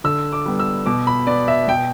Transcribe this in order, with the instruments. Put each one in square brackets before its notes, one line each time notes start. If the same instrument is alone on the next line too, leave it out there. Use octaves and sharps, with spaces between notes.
[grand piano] D3 E6
D6
G3 B3
E6
B2 D6
B5
B3 D5
E5
B2 G5